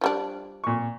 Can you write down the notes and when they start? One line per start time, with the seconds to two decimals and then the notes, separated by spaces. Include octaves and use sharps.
0.01 F3 G3 D4
0.64 A#2 C#6